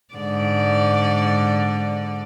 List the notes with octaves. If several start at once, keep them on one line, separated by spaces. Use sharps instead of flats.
G#2 D3 D5